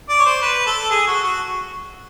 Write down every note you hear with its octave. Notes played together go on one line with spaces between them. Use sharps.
D5
C#5
C5
B4
A4
G#4
F#4
F#4